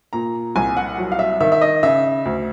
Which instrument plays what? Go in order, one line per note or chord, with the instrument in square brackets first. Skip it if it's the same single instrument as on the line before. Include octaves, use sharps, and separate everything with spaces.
[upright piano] A#2 A#5
C2 G#5
F#5
F#3
F5
E5
D#3 E5
E5
D#5
C#3 E5
D2